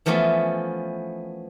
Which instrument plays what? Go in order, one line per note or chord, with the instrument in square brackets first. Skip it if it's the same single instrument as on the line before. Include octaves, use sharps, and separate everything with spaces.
[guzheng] E3 F3 A3 B3 C#4